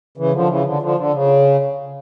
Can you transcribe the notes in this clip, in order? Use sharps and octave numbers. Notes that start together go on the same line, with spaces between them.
C#3 E3
D3 F3
C#3 E3
D3
D3 F3
D3
C#3